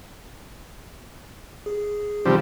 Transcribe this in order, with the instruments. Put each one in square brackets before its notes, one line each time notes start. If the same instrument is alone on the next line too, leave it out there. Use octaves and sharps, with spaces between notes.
[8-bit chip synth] G#4
[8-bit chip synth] C3 D#3 D#4 [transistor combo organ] F3 G3 C4